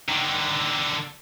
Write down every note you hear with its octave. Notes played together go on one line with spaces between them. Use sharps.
D3 D#3